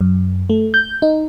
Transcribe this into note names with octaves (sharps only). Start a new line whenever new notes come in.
F#2
A3
G6
D#4